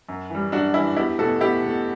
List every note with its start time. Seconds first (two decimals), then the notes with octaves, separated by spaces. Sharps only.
0.09 F#2
0.30 E3 G3
0.52 F#2 D4 F#4
0.74 E3 G3 E4
0.96 E2 E4 G4
1.19 B2 A3 F#4 A4
1.41 E2 E4 G4
1.63 B2 A3